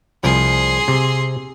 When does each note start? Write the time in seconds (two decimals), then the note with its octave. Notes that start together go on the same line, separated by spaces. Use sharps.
0.23 C2 F3 G#4 C6
0.88 C3